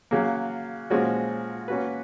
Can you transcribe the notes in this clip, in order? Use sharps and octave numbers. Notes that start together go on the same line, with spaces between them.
C#3 F#3 A#3
A#2 F3 G#3 C#4 F#4
A#3 C#4 F#4 B4